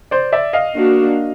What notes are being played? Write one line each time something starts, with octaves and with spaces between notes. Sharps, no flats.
C5 D5
D5 E5
D#5 F5
A#3 D4 F#4